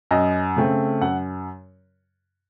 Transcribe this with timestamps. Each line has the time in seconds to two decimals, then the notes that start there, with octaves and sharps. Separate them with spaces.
0.11 F#2 D#5
0.57 C#3 A3 C4
1.01 F#2 F#5